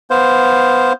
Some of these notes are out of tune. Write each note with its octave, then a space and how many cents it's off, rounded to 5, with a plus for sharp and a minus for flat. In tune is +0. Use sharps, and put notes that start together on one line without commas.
B3 +0 C5 +0 F5 +0